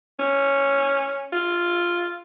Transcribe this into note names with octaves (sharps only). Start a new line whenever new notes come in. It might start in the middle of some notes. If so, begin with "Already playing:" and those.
C#4
F4